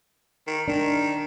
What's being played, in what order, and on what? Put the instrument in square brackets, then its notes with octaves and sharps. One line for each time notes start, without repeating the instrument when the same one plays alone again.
[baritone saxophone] D#3
[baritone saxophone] D#3 [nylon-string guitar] D4